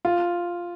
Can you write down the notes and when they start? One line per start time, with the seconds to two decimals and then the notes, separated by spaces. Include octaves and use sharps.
0.05 F4